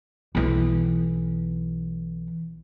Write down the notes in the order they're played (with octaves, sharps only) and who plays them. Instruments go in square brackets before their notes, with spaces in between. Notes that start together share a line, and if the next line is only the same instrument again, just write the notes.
[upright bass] B1 E3